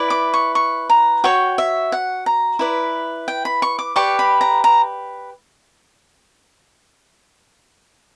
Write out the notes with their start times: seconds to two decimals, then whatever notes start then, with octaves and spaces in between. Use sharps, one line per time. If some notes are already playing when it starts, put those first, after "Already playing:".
Already playing: E4 B4 D5
0.10 D6
0.34 C#6
0.55 C#6
0.90 A#5
1.24 F#4 C#5 G5
1.58 E5
1.92 F#5
2.26 A#5
2.59 E4 B4 D5
3.28 G5
3.45 B5
3.62 C#6
3.79 D6
3.96 G4 B4 D5 C#6
4.19 B5
4.41 A#5
4.64 A#5